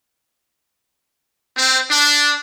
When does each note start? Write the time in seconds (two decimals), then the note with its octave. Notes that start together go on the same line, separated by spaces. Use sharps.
1.57 C4
1.90 D4